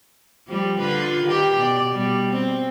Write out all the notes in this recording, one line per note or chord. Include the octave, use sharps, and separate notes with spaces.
F3 G3
D3 F4 B4
D#3 G4
B2 D5
B2 G3
C4